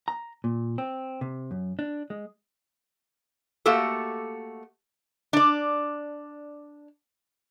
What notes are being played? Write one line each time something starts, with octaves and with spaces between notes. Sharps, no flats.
A#5
A#2
C4
C3
F#2
D4
G#3
A3 A#3 F#4 G4 A4
D4 D5